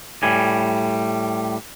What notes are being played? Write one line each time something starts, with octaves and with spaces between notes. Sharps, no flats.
A2 G3 G#5